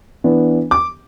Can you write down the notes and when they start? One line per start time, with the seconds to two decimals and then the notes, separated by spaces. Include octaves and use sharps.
0.24 E3 B3 D4
0.71 D6